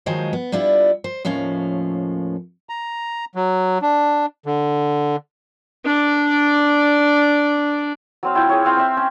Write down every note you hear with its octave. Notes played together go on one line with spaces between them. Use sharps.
D#3 F3 F#3 G#3 G#4 C5
B3
G3 B3 D4 E4 F4
C5
D#2 A2 F3 C#4 F5
A#5
F#3
D4
D3
D4 D5
F#3 C4 F5
E4 F4 G5
G#4 C#5
C4 F5 G5 E6
C4 E5
C#4